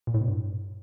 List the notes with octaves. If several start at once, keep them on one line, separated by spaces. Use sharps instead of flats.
A#2
A2
B2
G2